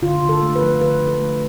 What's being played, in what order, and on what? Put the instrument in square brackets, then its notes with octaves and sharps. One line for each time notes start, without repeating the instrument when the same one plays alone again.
[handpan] D3 F4
D3
A4
A3
B4
F3
D3 B4
D3
A4
A3